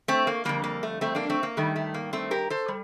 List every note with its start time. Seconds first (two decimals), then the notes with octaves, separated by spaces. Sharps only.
0.08 A3 C4
0.27 A#3
0.45 F2 D3 G3 A#3
0.64 A#3
0.83 A3
1.01 A3 C4
1.15 A#3 D4
1.30 A3 C4
1.43 A#3
1.57 G2 D#3 G3 A3
1.76 A3
1.94 A#3
2.13 A3 C4
2.31 G4 A#4
2.50 A4 C5
2.68 G3